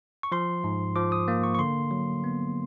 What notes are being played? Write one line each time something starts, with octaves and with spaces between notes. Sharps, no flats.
C#6
F3 C6
G#2
F3 D6
D#6
A#3
C#6
C#6
D3 C6
F#3
B3